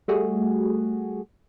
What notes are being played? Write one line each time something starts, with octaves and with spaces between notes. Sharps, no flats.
G3 A3 F#4 G#4